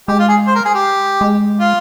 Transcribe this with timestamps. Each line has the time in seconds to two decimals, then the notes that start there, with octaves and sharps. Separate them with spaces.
0.08 G#3 G4
0.19 F4
0.28 G#4
0.47 C5
0.55 A#4
0.65 G#4
0.74 G4
1.21 G#3
1.60 F4